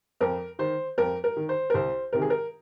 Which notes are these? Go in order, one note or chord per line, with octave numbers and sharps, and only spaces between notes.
F2 A#4
D#3 C5
F2 A#4
A#4
D#3
C5
A#4
C2 C5
C3 D#3 A#4
G#4
A#4